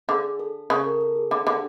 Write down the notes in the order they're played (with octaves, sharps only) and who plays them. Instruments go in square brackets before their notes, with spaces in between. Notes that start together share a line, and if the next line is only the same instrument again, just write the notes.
[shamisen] D3 [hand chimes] G#4
[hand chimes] A4
[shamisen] C#3 [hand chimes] A4
[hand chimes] A#4
A4
G#4
[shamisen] D3 [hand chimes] G#4
[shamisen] D3 [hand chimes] G4